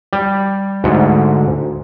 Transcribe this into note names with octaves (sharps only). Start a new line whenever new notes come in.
G3
D2 G#2